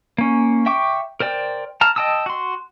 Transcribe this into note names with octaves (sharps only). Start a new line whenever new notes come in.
A#3 C#4
E5 G5 C#6 D6
A#4 C5 D5 G5
A5 A#5 F6
D#5 G5 A5 D#6 E6
F#4 C6